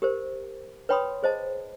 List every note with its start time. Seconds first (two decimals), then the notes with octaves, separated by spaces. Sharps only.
0.02 G4 A#4 C5
0.89 B4 C#5 G5 B5 C6 D#6
1.23 G#4 C5 D#5 A5